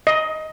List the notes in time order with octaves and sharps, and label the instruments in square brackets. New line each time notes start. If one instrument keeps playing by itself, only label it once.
[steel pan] D#5